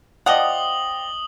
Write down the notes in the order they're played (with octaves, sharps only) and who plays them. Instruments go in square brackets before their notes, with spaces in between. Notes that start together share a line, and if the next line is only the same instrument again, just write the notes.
[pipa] F3 F#5 [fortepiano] D5 D#5 [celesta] G5 [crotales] D#6 F#7 G7